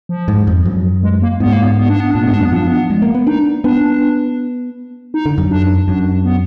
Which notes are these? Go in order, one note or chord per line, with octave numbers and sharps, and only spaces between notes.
F3
G#2
F2
F#2
G#3
A#3
G#2 B3
A#3
B3
B3
D4
B3
A#2 D4
G#2 B3
D4
F#2
B3
F3 D4
B3
G#3
A#3
B3
D4 D#4
B3 D4
D#4
D3
F#2
D4
F#2 D4
B3